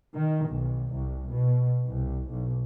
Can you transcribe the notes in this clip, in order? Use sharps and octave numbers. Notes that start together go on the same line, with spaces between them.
D#3
B1
C2
B2
C2
B1